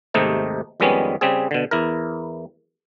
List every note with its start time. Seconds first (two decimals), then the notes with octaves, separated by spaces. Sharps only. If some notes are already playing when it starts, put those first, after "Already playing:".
0.14 D#2 G#2 C3 A3 D#4
0.80 F2 D#3 G3 G#3 B3 C#4
1.21 C#3 G3 C4 G#4
1.51 B2 D3
1.71 E2 E4 A#4